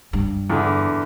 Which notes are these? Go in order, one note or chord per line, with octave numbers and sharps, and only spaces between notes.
G2
E2 D3